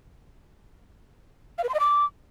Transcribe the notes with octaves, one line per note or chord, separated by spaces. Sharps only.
F5
B4
C6
D#5
D6